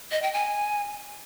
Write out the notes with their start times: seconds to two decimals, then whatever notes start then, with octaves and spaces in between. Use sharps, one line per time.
0.12 D#5
0.22 G5
0.33 G#5